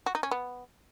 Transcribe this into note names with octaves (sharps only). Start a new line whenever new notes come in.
F#4
D#4
C#4
B3